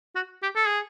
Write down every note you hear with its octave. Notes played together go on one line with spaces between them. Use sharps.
F#4
G4
A4
G#4